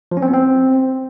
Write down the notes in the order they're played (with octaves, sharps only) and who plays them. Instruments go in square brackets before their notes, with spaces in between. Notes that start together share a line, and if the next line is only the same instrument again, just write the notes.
[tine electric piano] F3
C#4
C4
B3
C4